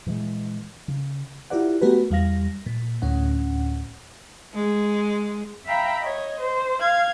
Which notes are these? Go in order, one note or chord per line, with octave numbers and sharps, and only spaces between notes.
A#2 E3 G3 G#3
C#3
E4 F4 G4 A#4 D5 F#5
A3 B3 F#4 G4 A#4 B4
E2 G3 F5 A#6
A#2
D2 A2 C#4 F#5
G#3
E5 F5 G5 A#5 B5
C#5 D#5
C5
F5 G#6